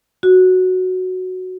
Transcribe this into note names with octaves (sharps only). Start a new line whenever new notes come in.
F#4